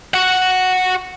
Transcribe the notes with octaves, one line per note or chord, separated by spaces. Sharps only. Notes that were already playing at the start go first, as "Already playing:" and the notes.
F#4 F#5